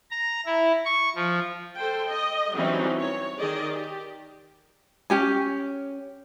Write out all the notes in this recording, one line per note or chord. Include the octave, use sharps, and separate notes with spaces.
A#5
E4
C#6
F3
A4 C5 G5
D#5
E3 F#3 G3 C4 C#4 D#4
C#5
D#3 G#4 D5 D#5
G4
C#4 G4 G#5